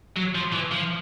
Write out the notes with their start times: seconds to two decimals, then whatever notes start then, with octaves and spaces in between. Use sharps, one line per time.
0.16 F#3
0.35 F3
0.53 E3
0.71 F3